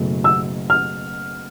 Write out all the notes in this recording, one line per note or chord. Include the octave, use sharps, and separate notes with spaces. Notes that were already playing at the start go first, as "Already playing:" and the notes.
Already playing: F#1 B2 F#3 A3
E6
F6